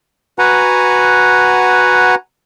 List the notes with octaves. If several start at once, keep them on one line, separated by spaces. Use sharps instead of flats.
F#4 B4 F#5 G#5 A#5